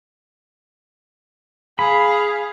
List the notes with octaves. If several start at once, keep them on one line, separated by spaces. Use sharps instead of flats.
G#4 F5 B5